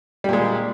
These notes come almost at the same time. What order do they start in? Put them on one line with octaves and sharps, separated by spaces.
G3 A#2 G#3